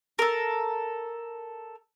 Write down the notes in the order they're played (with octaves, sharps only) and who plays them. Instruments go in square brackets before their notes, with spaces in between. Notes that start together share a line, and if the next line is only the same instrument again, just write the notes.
[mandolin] A4 A#4